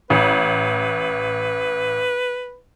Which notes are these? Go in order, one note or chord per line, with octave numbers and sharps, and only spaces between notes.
A1 B4